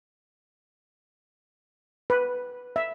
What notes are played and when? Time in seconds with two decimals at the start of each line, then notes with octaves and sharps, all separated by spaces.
2.10 B4
2.76 E5